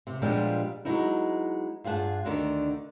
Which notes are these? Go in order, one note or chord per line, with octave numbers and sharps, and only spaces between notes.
C3
A#2 F3 G3 G#3 B3 D4
F#3 G#3 B3 D#4 E4
G2 F4 G#4 F#5 A5
D2 D3 D#3 D4